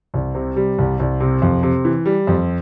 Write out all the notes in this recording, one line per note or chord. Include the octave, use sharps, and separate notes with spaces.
C2
C3
G3
C2
C2
C3
F2
C3
E3
G3
F2